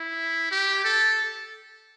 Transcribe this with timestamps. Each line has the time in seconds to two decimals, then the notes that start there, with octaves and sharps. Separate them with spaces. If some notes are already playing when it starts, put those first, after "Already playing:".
Already playing: E4
0.51 G4
0.85 A4